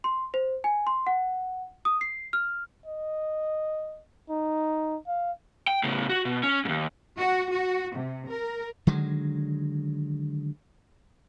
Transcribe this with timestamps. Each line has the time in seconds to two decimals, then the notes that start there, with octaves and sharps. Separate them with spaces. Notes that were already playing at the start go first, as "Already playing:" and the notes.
0.04 C6
0.34 C5
0.64 G#5
0.87 C6
1.07 F#5
1.85 D#6
2.01 C7
2.33 F6
2.86 D#5
4.30 D#4
5.07 F5
5.67 G5
5.84 A2 C#3
6.09 F#4
6.25 B2
6.43 C#4
6.65 D#2 G#2
7.17 F#4
7.52 F#4
7.96 C3
8.29 A#4
8.87 D3 D#3 F#3 G#3